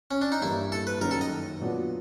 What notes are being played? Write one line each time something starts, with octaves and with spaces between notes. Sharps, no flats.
C#4
D4
D#4
G2 E3 G3 A#3 D4 E4
A4
B4
F#2 D#3 F#3 A#4
A4
D#5
A#2 F#3 B3 D4 F#4